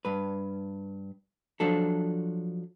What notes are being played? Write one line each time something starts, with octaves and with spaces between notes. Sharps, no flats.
G2 B4
F3 F#3 D4 A4